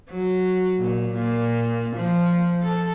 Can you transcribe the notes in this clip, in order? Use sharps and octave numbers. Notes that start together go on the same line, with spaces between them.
F#3
A#2
A#2
F3
A4